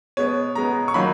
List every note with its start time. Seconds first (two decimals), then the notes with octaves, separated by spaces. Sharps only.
0.17 B2 G#3 B3 C#5
0.55 B2 G#3 B3 A#5
0.88 C#6
0.94 D#3 F#3 A#3 B5